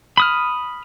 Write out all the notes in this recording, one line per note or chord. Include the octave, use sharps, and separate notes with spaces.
B5 D#6 F6